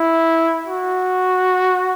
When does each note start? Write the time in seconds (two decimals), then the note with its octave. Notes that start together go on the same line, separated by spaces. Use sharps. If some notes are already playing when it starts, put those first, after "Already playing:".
Already playing: E4
0.66 F#4